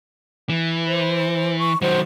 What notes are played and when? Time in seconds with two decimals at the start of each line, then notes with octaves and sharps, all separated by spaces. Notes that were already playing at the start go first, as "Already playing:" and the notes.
0.49 E3
0.87 C5
1.59 C#6
1.82 D#3 F#3 C5